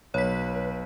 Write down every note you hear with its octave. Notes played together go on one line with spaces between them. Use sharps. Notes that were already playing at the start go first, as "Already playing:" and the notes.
B1 B4 C#5 B6